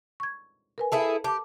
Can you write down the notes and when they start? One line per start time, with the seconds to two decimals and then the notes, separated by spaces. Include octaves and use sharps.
0.20 C#6 G#6
0.78 A#4 B4 G#5
0.92 E4 G#4 A4
1.24 G4 A5 D6